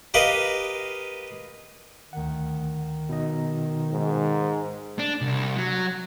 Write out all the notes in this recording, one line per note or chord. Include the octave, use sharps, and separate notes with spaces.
G4 A#4 B4 D#5 F5
D2 D#3 F#5
B2 D#4 D#5
G#2
D4
C2
F#3